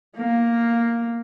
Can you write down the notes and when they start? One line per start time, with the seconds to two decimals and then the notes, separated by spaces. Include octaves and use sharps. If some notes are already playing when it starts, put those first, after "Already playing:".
0.17 A#3